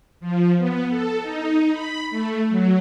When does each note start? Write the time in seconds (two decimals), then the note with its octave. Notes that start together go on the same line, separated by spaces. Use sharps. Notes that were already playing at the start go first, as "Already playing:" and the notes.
0.20 F3
0.58 B3
0.89 A4
1.22 D#4
1.72 B5
2.10 A3
2.49 F#3